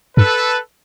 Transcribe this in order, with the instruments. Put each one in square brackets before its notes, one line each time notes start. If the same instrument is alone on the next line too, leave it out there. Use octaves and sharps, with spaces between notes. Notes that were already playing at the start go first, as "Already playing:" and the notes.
[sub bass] G2 [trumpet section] A4 B4